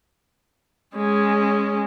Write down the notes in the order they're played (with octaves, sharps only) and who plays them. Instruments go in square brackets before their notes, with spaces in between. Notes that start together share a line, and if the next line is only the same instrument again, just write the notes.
[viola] G#3 C#4